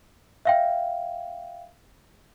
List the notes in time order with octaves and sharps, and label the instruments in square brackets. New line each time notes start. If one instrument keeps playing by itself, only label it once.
[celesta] E5 F5 G5